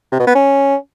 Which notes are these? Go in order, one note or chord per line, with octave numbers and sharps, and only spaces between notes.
C3
B2
B3
C#4